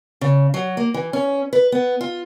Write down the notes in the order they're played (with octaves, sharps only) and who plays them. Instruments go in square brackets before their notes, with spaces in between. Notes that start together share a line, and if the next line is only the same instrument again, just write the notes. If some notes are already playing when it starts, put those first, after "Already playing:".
[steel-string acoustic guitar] C#3
F#3
A#3
E3
C#4
B4
B3
F4